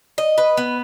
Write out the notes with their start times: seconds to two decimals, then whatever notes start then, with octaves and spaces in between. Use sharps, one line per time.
0.18 D#5
0.38 B4
0.57 B3